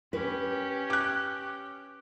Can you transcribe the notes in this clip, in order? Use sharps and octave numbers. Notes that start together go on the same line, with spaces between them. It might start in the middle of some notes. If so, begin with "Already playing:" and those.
C#4 G4 B4
D6 F#6